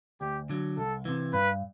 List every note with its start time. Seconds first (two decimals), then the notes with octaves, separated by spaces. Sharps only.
0.21 D2 G4
0.49 D3 F#3
0.77 C2 A4
1.05 C3 E3
1.33 G2 B4